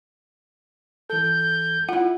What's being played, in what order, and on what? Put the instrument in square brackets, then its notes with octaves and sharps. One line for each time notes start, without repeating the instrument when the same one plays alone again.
[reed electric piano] E3 A4 [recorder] G6
[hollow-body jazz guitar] E4 F#5 [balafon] F4